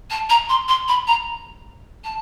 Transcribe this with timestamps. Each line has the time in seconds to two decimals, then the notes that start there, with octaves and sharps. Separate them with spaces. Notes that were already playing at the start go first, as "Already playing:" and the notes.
0.10 A5
0.29 A#5
0.49 C6
0.68 C6
0.88 B5
1.07 A#5
2.04 A5